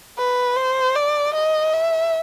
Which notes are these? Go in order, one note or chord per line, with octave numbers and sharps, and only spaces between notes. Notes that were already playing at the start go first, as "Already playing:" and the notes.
B4
C5
D5
D#5
E5